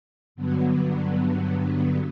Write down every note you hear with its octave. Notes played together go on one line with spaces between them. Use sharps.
G2 D3 F#3 B3